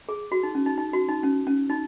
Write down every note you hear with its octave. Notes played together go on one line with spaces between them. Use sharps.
G#4
F#4
D#4
C#4
D#4
D#4
F#4
D#4
C#4
C#4
D#4